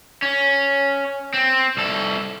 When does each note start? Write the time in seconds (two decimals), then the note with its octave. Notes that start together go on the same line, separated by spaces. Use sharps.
0.22 C#4
1.34 C4
1.77 C2 A4